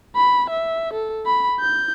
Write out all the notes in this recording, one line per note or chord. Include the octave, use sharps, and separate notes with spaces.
B5
E5
A4
B5
G6